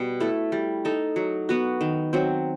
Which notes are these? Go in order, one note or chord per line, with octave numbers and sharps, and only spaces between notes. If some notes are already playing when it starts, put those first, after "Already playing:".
Already playing: B2 G3
A3 E4 A4
G3
D#4 A4
F#3
B3 F#4
D#3
F#3 C4